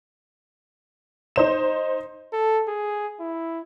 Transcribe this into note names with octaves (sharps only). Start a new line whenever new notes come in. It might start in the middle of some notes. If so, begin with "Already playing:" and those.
D#4 C5 E7
A4
G#4
E4